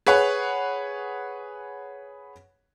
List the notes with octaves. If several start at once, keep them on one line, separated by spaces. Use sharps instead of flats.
G#4 B4 C#5 F#5